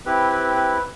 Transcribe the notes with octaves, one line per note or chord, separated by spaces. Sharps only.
C4 E4 G4 B4
B4
B4